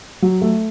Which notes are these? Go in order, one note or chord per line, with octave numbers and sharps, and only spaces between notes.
F#3
A3